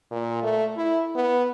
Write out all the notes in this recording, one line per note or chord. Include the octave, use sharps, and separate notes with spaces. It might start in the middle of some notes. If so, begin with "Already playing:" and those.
A#2
A3
E4
B3